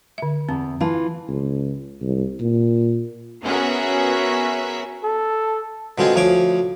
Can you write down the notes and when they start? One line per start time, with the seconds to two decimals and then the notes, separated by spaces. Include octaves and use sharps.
0.18 D3 E5
0.49 E2 C4
0.81 E3 F4 F5 A5
1.29 C#2
2.01 C2
2.40 A#2
3.44 B3 C#4 F#4 G#4 A#4 E5
5.04 A4
5.98 B2 D3 G#3 C4 F4 G#4
6.15 D2 F3 C#5 C#6 D6